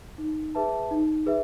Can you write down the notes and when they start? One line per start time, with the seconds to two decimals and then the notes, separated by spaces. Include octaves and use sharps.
0.18 D#4
0.55 G#4 B4 E5 A5
0.91 D#4
1.26 G#4 B4 E5